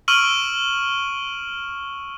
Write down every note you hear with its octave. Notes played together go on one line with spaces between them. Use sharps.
C#6 E6 F6 D7 D#7 F#7